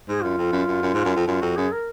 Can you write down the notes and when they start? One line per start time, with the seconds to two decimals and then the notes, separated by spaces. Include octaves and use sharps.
0.08 G#2 G#4
0.23 F#2 F4
0.38 F2
0.52 F#2
0.68 F#2
0.82 F#2
0.94 G#2
1.05 F#2
1.16 F2
1.27 F#2 F4
1.41 F2 F#4
1.56 F#2 G#4
1.72 A#4